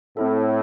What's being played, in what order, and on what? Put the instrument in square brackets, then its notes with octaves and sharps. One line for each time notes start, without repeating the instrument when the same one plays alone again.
[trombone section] A2 [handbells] C4 E4 A4